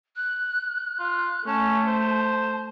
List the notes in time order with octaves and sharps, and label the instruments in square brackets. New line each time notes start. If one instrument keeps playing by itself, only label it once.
[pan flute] F#6
[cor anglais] F4
[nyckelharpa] A3 [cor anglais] C#4 [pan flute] A5
[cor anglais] C5